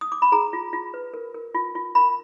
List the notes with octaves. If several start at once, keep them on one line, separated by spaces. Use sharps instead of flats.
D#6
D6
B5
G#4 A#5
F4
F4
B4
A#4
A#4
F4
F4
A#4 B5